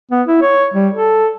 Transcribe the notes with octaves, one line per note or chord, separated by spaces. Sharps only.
B3
E4
C#5
G3
A4